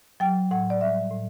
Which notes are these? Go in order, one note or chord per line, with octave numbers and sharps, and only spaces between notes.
F#3 G5
A2 F#5
D5
G3 E5
A2